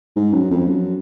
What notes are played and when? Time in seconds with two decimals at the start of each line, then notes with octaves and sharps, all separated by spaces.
0.16 G#2
0.33 F#2
0.51 F2
0.67 F#2